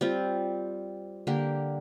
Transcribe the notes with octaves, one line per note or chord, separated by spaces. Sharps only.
G3 C4 F4
D3 A#3 G4